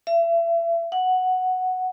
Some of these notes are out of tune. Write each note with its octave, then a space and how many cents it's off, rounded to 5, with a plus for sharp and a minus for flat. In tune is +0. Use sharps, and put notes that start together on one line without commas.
E5 +35
F#5 +0